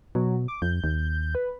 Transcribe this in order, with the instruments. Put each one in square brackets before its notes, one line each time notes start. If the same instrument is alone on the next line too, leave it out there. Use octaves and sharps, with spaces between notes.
[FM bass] B2 [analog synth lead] F#3
[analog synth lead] D6
[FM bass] F2 [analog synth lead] G6
[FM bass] D#2
[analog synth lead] B4